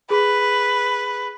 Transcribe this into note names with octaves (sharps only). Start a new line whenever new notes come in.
G#4 B4